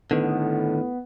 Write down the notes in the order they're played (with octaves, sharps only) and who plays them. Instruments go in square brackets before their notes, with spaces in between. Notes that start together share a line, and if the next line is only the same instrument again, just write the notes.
[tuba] A2 [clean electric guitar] D3 D#3 [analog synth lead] B3